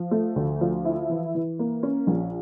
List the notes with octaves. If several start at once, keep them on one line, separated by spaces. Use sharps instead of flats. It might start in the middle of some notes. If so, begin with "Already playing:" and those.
Already playing: F3
A3
D2
F3
E4
E3
E3
A#3
C#4
A#1